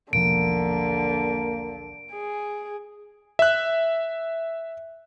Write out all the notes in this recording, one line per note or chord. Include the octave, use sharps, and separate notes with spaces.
E1 B1 D3 F3 A#3 D7
G#4
E5 F#6